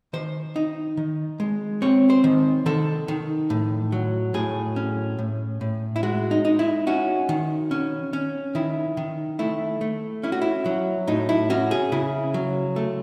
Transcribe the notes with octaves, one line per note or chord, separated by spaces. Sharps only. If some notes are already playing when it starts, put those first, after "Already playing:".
D#3 C5
D#4
D#3
G#3
C4 C#5
C5
D#3
D#3 A4
D#3
A2
F#3
A2 G#4
C#4
A2
A2
E4
G#3 F#4
D#4
D#4
E4
C#4 F#4
D#3
C#4
C#4
D#3 E4
D#3
A3 E4
A3
C#4 E4
F#4
E4
F#3
A2 D#4
E4
C#4 F#4
G#4
C#3 E4
F#3
A3